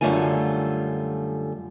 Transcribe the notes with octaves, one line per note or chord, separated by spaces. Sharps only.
F#2 D3 G3 A3 F4 G#5